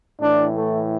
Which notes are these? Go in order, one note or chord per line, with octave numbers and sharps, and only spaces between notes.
A2 E3 D4
A3